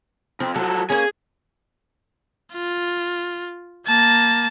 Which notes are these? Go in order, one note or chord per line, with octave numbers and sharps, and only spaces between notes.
F2 C4
F3 F#3 A4
A#3 C#4 G#4
F4
A#3 A5